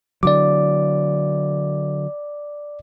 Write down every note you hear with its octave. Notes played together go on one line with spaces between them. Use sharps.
D3 F#3 D5 D6